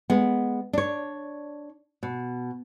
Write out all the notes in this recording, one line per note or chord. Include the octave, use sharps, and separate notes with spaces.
G#3 B3
D4 C#5
B2